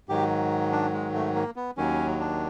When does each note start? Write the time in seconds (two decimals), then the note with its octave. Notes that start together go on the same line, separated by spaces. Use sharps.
0.09 G#2 D#3 F#3 G4
0.72 D4
0.93 G#3
1.14 A3
1.36 A#3
1.56 B3
1.77 D#2 D#3 F#3 C#4
2.20 D4